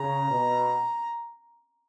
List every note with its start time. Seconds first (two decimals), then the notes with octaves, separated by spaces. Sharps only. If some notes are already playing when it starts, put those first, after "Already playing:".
Already playing: C#3 A#5
0.30 B2